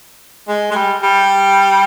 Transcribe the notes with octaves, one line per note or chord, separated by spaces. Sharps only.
G#3
G#3
G3
G3